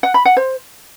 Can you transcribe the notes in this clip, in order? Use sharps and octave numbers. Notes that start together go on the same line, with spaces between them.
F#5
B5
F#5
C5